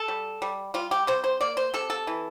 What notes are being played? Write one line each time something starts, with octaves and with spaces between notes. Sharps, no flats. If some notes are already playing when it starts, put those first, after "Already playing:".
Already playing: A4
G3
G3
G3 F4
G4
C3 C5
C5
A#3 D5
C5
C3 A4
A4
E3